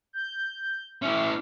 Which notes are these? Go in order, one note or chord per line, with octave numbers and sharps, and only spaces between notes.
G6
C#4 E4 E5